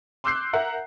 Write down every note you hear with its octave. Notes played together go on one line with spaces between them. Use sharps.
C6 D6 E6 F#6 G6 C7
A#4 E5 F#5 A#5